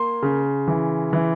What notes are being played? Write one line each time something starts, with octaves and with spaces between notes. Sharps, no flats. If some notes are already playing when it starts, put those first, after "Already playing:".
Already playing: A#3 C6
C#3
E3
E3